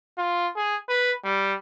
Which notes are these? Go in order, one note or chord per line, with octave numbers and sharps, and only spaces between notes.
F4
G#4
B4
G3